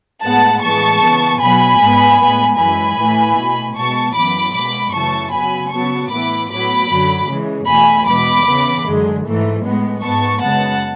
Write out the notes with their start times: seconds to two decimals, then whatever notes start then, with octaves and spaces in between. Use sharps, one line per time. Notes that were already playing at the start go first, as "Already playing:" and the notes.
0.23 A2 G#3 B3 F#5 A5
0.62 A2 E3 G#3 B3 A5 C#6
1.02 C#3 E3 B3
1.41 B2 F#3 B3 G#5 B5
1.80 G#2 G#3 B3
2.19 A2 G#3 B3
2.58 F#2 E3 G#3 G#5 B5
2.98 A2 E3 A3
3.37 B2 A3
3.76 B2 G#3 B3 A5 C#6
4.15 F#2 E3 B3 B5 D6
4.54 B2 G#3 B3 B5 D6
4.93 F#2 C#3 E3 A3 A5 C#6
5.32 C#3 F#3 B3 G#5 B5
5.71 C#3 F#3 B3 A5 C#6
6.11 A2 E3 B3 B5 D6
6.50 A2 F#3 B3 B5 D6
6.89 F#2 D3 F#3
7.28 C#3 E3 G#3
7.67 E2 B2 A3 G#5 B5
8.07 E2 B2 G#3 B3 B5 D6
8.46 C#3 E3 B3
8.86 F#2 D3 G#3
9.25 G#2 E3 A3
9.64 A2 G#3 B3
10.02 G#2 G#3 B3 A5 C#6
10.42 F#2 C#3 G#3 B3 F#5 A5